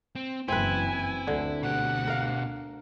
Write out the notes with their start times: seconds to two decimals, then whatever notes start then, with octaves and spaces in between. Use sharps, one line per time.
0.15 C4
0.48 F#1 E3 C4 E4 B4 G#5
1.27 D2 D3
1.63 B2 G4 F#5
2.07 A#4 F5